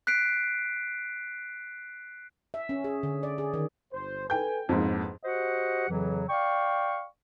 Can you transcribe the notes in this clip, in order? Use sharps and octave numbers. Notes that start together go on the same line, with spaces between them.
F#6 B6 C7 D7
E5
C#4
G#4
D3
D5
G#4
D#3
G1 C5
A4 B4 G5 G#5 G6
A1 F2 G#2 A#3 B3
F#4 G4 C5 D#5 F#5
F2 C#3 E3 F#3
D5 F5 G5 C#6